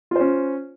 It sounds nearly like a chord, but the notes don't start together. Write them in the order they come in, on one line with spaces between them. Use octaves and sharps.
F4 C5 C#4